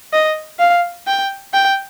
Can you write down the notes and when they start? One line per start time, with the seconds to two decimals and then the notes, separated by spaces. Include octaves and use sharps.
0.13 D#5
0.59 F5
1.07 G5
1.53 G5